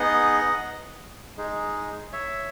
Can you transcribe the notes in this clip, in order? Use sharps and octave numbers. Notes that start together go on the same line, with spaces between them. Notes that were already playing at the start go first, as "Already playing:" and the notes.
Already playing: B3 D#4 G#4 D#5 F#5
G#3 D#4 G#4
C#5 E5